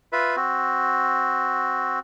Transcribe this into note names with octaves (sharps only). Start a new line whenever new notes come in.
F4 B4 E5
C4 F#4